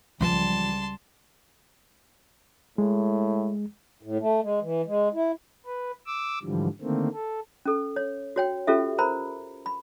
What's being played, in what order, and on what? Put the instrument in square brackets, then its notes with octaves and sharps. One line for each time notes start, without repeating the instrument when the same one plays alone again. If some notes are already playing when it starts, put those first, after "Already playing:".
[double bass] C#2 G3 [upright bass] E3 F3 [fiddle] A5 C6
[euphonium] A2 [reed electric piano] G#3
[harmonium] A2
A3
G#3
E3
G#3
E4
[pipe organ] B4
D6 E6
G#2 D3 E3 F3 G3
D3 D#3 A3 A#3 C4
A4
[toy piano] C#4 A4
C#5
F#4 C#5 G5
C#4 F4 G4 A4 E5
A#4 C5 A#5 B5
B5